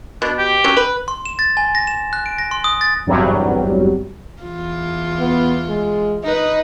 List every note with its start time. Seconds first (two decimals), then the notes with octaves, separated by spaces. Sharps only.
0.22 B2 D4
0.38 G4
0.64 F#3 C#4
0.77 B4
1.08 C6
1.26 E7
1.39 A6
1.57 G#5
1.75 A#6
1.87 E7
2.13 F#6
2.26 D7
2.38 A#6
2.51 C6
2.64 D#6
2.81 A6
3.07 G#1 E2 G2 C3 F#3 G3
4.43 E2 F4
5.19 B3
5.69 G#3
6.24 D#4 B4 D#5